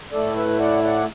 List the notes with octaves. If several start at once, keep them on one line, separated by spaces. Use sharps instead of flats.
A2 A3 E4 A4 D5
B4 E5
E5
D5 F#5
D5 F#5